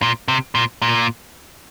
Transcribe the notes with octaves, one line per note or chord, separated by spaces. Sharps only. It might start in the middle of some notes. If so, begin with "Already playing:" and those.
A#2
C3
A#2
A#2